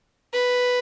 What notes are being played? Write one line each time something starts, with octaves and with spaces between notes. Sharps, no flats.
B4